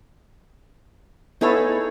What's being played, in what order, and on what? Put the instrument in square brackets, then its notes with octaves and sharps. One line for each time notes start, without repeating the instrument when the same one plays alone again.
[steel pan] B3 E4 A4 [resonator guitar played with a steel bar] D#4 G#4 C#5